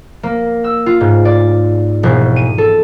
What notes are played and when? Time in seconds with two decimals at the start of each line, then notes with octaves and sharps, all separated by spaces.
0.23 A#3
0.64 E6
0.86 F4
1.01 G#2
1.25 D5
2.03 E1
2.36 D#7
2.58 A4